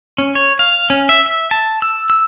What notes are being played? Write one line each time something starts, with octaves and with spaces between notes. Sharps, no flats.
C#4
C#5
F5
C#4
E5
E5
A5
E6
E6